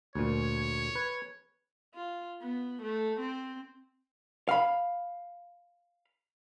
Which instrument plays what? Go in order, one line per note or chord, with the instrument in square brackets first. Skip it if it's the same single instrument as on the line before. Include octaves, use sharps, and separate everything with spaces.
[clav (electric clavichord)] D2 A#2 [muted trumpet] C#5
[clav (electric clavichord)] B4
[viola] F4
B3
A3
C4
[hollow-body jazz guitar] F5 B5